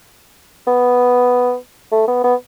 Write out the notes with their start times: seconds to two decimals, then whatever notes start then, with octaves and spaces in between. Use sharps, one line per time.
0.67 B3
1.92 A3
2.08 B3
2.24 B3